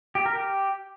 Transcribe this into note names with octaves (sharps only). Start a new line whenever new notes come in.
G4
A#4
G4